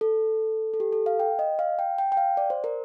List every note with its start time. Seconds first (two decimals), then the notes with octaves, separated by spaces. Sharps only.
0.01 A4
0.74 A4
0.80 G4
0.92 A4
1.06 F5
1.20 G5
1.39 D#5
1.59 F5
1.79 G5
1.98 G5
2.12 G5
2.17 F5
2.37 D5
2.50 C5
2.64 A#4